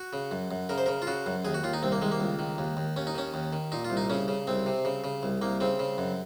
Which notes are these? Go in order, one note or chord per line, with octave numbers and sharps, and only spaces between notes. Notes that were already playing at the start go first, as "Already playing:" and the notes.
Already playing: F#4
C#3
F#2
F#2
C#3 A#4
C5
C#3 A#4
F4
C#3 F#4
F#2
D#2 G#4
F#4
D#2 F4
D#4
C2 C4
A#3
D#3 G#3
A#3
C#2
D#3
D#2
D#2
D#2 C#4
D#4
D#3 C#4
D#2
D#3
A#2 D#4
F4
C2
D#4
C#3 C#4
C#3
C2 C4
C3
C#3
C#3
C2
C2 A#3
C#3 C4
C#3
F#2